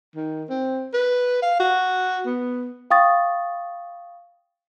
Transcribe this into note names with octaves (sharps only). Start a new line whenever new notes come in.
D#3
C4
B4
F5
F#4
B3
F5 G5 C#6 D#6 A6